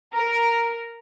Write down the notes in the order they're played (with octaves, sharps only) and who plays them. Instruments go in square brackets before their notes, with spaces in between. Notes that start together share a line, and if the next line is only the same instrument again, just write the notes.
[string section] A#4